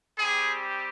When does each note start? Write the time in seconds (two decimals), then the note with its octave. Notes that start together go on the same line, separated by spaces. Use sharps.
0.19 G3 C4 G4 G#4